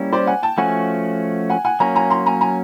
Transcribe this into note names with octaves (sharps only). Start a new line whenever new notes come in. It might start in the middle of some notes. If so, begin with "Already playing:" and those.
Already playing: G3 A#3 C#4 E4
C5 D5
F#5 G#5
G5 A5
F3 A3 C#4 F#4 F#5 G#5
F#5 G#5
F#5 G#5
F#3 A#3 C#4 G#5 A#5
G#5 A#5
A#5 C6
G#5 A#5
G#5 A#5